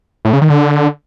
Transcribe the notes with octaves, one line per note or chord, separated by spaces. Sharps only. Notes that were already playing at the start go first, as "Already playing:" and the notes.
A2
C#3
D#3
D3